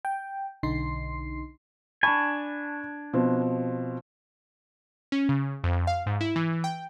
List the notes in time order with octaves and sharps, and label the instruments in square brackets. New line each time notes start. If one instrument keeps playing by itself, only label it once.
[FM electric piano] G5
B1 D3 D#4 C6 C7
[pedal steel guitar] D4 G#5 [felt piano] A5 B5 C#6
[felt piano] B2 F3 C4
[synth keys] C#4
C#3
F2
F5
G#2
E4
E3
G5